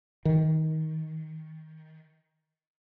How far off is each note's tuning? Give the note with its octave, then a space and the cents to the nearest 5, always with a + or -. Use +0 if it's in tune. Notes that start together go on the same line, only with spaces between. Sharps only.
D#3 +20